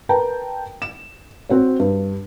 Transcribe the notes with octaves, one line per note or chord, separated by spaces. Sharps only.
A#4 B4 G5 A5 A#5
E7
C4 F#4 C#5
G2